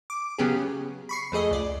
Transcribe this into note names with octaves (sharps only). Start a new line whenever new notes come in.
D6
C#3 F#3 B3 C#4 G4 G#4
B5 C#6 C7
F2 A3 G#4 D#5
C#2 D5